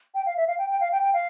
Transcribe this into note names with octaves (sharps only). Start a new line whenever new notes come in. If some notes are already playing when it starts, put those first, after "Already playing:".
G5
F5
E5
F5
G5
G5
F5
G5
G5
F5